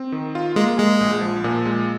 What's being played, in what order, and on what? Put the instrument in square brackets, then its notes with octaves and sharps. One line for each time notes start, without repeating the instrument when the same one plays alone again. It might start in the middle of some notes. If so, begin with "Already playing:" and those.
Already playing: [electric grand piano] C4
D#3
F4
[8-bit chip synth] G#3 [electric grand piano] A#3
[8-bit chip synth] G#3 [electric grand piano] G#4
[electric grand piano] A#1
F3
A#2
G#3